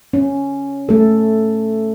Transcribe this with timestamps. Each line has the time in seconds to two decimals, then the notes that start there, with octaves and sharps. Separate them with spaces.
0.13 C#4
0.89 A3 A4